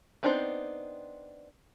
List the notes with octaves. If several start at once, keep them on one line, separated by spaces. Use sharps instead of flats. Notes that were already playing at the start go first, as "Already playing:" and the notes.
B3 C4 D4 D#4 C5